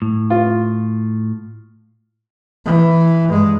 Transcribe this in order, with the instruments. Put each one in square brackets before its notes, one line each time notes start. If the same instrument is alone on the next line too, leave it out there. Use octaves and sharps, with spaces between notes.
[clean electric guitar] A2
[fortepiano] F4
[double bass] E3
G2 G#3